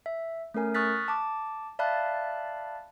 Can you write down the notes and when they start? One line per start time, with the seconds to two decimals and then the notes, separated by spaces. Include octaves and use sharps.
0.06 E5
0.54 A3 C#4 A#4 G#5
0.74 C#6 D#6 F6 F#6 A6 B6
1.08 A5 D6
1.79 D5 E5 F5 A5 B5 F#6